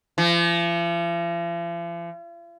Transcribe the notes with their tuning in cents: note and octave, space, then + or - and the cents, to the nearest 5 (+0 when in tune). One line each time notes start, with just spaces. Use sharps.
F3 -45